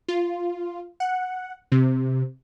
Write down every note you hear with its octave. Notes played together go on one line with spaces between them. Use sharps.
F4
F#5
C3